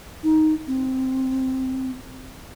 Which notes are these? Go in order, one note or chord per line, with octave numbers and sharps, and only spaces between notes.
D#4
C4